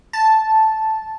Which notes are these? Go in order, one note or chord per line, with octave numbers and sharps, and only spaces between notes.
A5